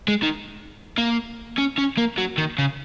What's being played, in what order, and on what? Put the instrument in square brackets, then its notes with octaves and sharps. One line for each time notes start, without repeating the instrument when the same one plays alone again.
[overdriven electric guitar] G#3
D#3
A#3
C#4
C#4
A#3
F#3
D#3
C#3